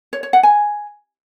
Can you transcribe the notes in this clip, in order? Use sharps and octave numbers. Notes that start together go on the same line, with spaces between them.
C#5
C#5
F#5
G#5